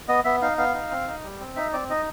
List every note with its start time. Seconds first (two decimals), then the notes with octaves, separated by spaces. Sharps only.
0.08 B3 D#5
0.25 B3 E5
0.42 D#4 F5
0.58 B3 F5
0.74 D#4
0.91 C4
1.07 D#4
1.23 G3
1.40 C4
1.56 D#4 E5
1.73 C4 D5
1.90 D#4 D#5